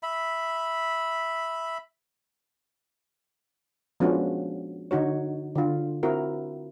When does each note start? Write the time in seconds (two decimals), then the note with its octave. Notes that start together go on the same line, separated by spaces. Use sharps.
0.03 E5 B5
4.00 F3 G#3 B3 C#4 D4 F#4
4.91 D3 D#4 F#4 C#5
5.55 D3 F4
6.03 C4 E4 F#4 A#4